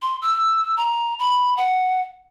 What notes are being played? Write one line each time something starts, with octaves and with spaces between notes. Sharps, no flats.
C6
E6
A#5
B5
F#5